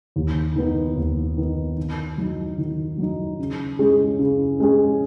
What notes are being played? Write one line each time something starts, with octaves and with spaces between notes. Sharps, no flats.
D#2
D#3 B3 D#4
D#2
D#3 B3 D#4
D#3
F#3 D#4
D#3
F#3 D#4
C#3
G#3 C#4 G#4
C#3
G#3 C#4 G#4